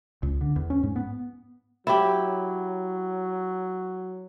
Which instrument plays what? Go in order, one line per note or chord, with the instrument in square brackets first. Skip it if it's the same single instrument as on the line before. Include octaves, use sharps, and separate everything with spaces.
[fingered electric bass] C#2
D3
E2
C#4
G#2
B3
[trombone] F#3 [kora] E4 G4